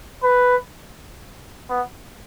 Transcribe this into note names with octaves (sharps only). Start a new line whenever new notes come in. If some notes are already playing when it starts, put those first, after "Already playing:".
B4
B3